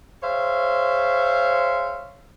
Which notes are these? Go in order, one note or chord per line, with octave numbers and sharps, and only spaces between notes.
G#4 C5 C#5 E5 F5